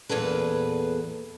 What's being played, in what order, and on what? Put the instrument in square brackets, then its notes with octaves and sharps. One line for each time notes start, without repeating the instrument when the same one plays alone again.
[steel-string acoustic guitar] E2 A#2 G#4 A4 B4